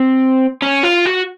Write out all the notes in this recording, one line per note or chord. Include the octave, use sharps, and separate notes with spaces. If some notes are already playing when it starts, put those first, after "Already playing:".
Already playing: C4
C#4
F4
F#4